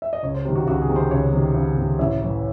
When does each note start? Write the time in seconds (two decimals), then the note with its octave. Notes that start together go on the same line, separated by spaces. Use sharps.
0.02 E5
0.13 D#5
0.23 C#2 C#5
0.34 C5
0.45 C3 D#3 C5
0.55 F#4
0.67 C#2 F#4
0.82 G#4
0.89 C3 D#3
0.96 C5
1.11 C#2 C#5
1.33 C3 D#3
1.55 C#2
1.77 C3 D#3
1.99 A1 E5
2.21 A2 E3